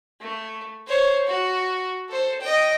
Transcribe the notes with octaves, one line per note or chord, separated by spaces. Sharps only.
A3
C5 C#5
F#4
A4 C5
D#5 G5